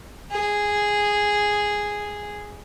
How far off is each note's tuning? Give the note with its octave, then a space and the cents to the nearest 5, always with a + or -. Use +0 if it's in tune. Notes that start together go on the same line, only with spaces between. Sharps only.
G#4 -5